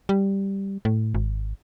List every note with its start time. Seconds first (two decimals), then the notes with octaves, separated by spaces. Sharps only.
0.09 G3
0.85 A2
1.14 G#1